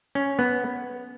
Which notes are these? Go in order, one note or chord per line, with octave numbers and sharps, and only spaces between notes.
C#4
B3